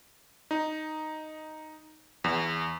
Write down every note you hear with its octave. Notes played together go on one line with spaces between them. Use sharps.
D#4
E2